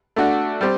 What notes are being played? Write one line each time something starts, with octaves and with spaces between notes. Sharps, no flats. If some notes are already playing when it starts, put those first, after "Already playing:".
A3 D4 F#4
G3 C4 G4